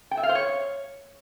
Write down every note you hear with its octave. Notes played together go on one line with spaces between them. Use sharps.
G5
E5
F5
C5
C#5